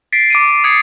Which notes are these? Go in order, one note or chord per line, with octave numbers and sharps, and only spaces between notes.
A6 B6 C7 D7
D6 D7 D#7
D#6 G#6 C7 C#7